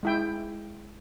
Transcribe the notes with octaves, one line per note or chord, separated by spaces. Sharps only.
G#3 E4 G5